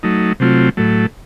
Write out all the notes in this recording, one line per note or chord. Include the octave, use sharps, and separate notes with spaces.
F#3 A3 D#4
C3 F#3 A3 C4 F4
A2 F#3 A3